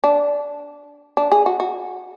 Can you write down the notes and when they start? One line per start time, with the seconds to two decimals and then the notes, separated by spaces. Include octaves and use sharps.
0.04 D4
1.17 D4
1.32 G#4
1.46 F#4
1.60 F#4